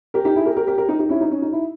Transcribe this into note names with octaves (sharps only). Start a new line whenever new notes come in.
G4 A#4
D#4 G4
E4 G#4
G4 A#4
G4 A#4
G4 A#4
G4 A#4
D#4 G4
D#4 G4
C#4 E4
D#4
C#4
D#4
E4